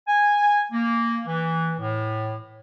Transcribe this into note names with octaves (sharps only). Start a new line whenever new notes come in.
G#5
A#3
E3
A2